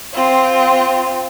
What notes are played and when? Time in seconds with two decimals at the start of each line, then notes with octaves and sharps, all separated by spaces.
0.14 C4 F4